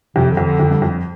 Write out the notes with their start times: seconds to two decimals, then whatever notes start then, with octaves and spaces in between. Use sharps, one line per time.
0.16 F2 C3
0.30 D3
0.37 F2
0.45 D3
0.59 F2
0.71 G2
0.82 F2